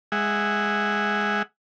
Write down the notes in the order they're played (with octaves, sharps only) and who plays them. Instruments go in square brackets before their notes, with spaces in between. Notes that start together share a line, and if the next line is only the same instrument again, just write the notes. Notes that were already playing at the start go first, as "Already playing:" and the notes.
[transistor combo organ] G#3 G#4 E5 F#5